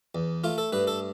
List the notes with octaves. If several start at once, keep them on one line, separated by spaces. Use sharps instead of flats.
E2
A3 F4
A4
G2 B4
A4